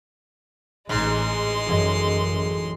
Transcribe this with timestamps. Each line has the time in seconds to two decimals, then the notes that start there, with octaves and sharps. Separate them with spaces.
0.89 A1 G#2 G#3 D#4 C6
1.68 A1 F#2 E3 D#5